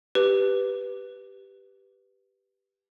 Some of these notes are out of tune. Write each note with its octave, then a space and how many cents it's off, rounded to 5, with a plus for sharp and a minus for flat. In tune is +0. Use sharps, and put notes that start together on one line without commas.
G4 +0 B4 +0